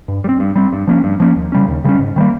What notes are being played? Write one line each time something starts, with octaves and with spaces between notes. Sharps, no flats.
G2
G3
C4
G2
G3 C4
G2
F3 A#3 C#4
G2
F3 A#3 C#4
D#2
C#3 G3 C#4
D#2
C#3 G3 C#4
G#2
D#3 G3 A#3